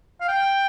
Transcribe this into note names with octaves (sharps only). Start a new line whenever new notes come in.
F5
G5